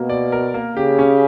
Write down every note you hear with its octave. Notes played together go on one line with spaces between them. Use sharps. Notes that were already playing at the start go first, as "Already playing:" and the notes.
Already playing: B2 A#3
D5
A#4
A#3
C#3 G4
C#4